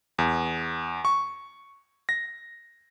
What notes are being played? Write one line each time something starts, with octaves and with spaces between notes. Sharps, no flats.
E2
C#6
A#6